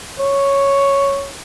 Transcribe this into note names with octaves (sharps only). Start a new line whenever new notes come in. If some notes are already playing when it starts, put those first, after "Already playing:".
C#5